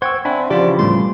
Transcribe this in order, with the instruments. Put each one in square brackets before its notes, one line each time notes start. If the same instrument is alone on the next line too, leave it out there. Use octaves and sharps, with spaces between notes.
[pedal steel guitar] C5 G5 E6 [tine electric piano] F#5 C#6 G#6
[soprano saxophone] C4 [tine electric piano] D4 [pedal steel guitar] E5 G#5 B5
[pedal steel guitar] C#3 E3 [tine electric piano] F3 F4 [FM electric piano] G4 [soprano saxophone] D5
[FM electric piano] A2 G3 A3 [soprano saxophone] C6